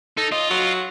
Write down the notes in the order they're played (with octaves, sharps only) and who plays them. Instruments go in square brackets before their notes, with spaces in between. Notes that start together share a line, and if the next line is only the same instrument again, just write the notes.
[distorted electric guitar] D#4 [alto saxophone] A4
[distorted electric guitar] F4 [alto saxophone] D#5
[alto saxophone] F#3